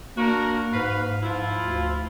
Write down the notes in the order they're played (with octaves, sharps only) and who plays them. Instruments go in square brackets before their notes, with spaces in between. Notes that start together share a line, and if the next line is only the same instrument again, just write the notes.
[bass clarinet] A#3 [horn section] D4 F#4 A#4
[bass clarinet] G#2 [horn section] B4 F5
[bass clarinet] G#2 [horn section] F3 E4 F4
[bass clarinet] D2